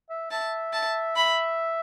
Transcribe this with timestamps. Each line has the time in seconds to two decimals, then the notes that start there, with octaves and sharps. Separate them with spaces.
0.10 E5
0.31 E5 A5
0.73 A5
1.17 E5 B5